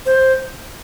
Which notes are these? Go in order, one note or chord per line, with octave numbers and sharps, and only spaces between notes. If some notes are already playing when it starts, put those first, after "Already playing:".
C5